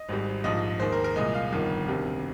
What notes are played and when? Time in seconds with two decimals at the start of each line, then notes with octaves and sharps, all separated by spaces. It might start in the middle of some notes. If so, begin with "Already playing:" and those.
Already playing: D#5
0.09 G#1 G#2 G3
0.44 A#1 G#2 F3 D#5
0.80 D#2 D#3 G#3 C5
0.92 A#4
1.04 A#4
1.16 C2 A#2 G#3 D#5
1.34 F5
1.52 G1 F2 D#3
1.88 D2 C3 D#3 G3